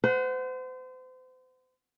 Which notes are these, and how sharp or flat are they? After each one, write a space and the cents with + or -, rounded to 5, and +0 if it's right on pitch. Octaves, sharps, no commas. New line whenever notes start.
C5 -35 F#5 +0